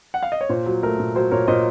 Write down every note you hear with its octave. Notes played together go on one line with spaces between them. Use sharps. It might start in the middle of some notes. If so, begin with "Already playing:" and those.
F#5
F5
D#5
C#5
A#2 C5
F#3
A3 A#4
A#2
F#3 C5
A#2 A#4 C#5
A#2 C5 D#5